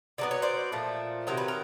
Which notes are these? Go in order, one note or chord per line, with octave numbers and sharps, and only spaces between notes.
D3 F#3 B3 D5
C#5
C5 D5
A#2 F3 A3
C3 D#3 F#3 A#4
B4
A#4